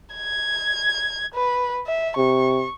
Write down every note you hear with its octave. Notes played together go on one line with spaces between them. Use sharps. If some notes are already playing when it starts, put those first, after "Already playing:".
G#6
B4
E5
C3 C#6